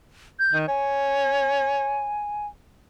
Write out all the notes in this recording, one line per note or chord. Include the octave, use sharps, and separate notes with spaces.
G6
D#3
C#5 G#5